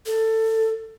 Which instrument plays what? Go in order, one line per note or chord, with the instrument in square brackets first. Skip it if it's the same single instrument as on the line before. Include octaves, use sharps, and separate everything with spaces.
[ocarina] A4